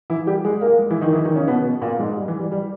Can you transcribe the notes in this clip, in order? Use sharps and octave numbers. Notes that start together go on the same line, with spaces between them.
E3 E4
G3 G4
G#3 G#4
A#3 A#4
G#3 G#4
E3 E4
D#3 D#4
E3 E4
D#3 D#4
C#3 C#4
B2 B3
B2 B3
A#2 A#3
G#2 G#3
G3
E3
G3
G3